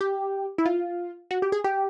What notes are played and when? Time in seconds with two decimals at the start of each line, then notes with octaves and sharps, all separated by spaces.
0.01 G4
0.58 E4
0.66 F4
1.31 F#4
1.42 G4
1.52 G#4
1.64 G4